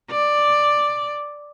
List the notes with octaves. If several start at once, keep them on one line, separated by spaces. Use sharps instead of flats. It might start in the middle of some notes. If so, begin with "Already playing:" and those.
D5